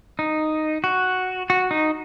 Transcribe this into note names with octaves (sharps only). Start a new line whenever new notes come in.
D#4
F#4
F#4
D#4